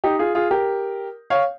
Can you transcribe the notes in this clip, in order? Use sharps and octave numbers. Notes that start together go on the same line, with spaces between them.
D#4 G4
F4 G#4
F4 G#4
G4 A#4
C#5 F5